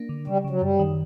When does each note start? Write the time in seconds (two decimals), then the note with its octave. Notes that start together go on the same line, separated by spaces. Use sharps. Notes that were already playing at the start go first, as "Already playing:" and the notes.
Already playing: A#3 D4
0.09 D3
0.27 C#3 G3
0.44 C#3
0.50 F#3
0.61 F#2 G3
0.79 D#3